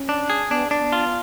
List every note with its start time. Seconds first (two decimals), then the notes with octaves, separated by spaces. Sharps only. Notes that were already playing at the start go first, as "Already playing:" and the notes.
Already playing: C#4
0.09 D4
0.30 G#4
0.50 B3 D4
0.71 D4
0.77 B3
0.92 F4